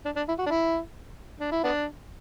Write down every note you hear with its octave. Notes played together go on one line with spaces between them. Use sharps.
D4
D4
E4
F#4
D4
E4
D4
E4
B3 D4